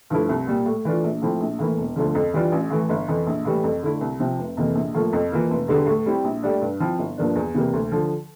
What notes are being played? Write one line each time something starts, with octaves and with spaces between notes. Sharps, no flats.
G2 F3 A3 E4
C2
A#2 G3
A2
E3 A3 D4 F4
A#1
A2 F3 C4 E4
A#1
A2 E3 A#3 E4
E1
D2 D3 F3
F2
E3 G3 D4 F4
A1
A2 E3 A3
G1
F2 E3
A#1
A2 E3 G3
F2
D3 A3 E4
C2
C3 F3 C4
F1
F2 C3 E3 A#3
A#1
A2 F3 A#3
F2
E3 A#3 F4
F1
E2 D3 G3
A2
G3 C4 E4
A#1
A2 G3 D4
G2
F3 C4 E4
G1
G2 F3 A#3 D4
E2
C3 E3 G3 A#3
D2
D3 F3